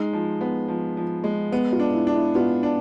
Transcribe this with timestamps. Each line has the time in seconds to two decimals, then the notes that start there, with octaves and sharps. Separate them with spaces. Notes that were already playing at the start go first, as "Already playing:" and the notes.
Already playing: G#3 D#4
0.13 F3
0.41 B3
0.68 F3
0.97 F3
1.24 G#3
1.52 B3
1.72 F4
1.79 D4
1.93 E4
2.07 D4
2.14 E4
2.35 B3 F4
2.63 D4